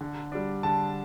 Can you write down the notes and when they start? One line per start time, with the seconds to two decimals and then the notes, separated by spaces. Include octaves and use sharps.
0.01 D3
0.32 G3 D4
0.63 D3 A5